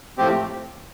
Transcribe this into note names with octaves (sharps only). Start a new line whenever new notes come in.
A2 F3 A3 C4 G4